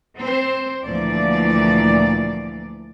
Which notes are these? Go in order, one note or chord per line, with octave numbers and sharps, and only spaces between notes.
C4 C5
D2 A#2 E3 F3 D5